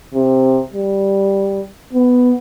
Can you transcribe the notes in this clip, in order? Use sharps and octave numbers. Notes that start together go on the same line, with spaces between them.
C3
G3
B3